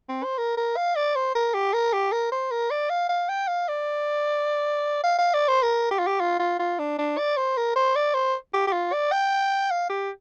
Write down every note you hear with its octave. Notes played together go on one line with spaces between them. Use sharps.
C4
C5
A#4
A#4
F5
D5
C5
A#4
G4
A#4
G4
A#4
C5
A#4
D5
F5
F5
G5
F5
D5
F5
F5
D5
C5
A#4
G4
F4
G4
F4
F4
F4
D4
D4
D5
C5
A#4
C5
D5
C5
G4
G4
F4
D5
G5
F5
G4